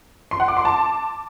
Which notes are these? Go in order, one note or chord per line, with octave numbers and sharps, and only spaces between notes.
C6
F#5
D6
C6
A5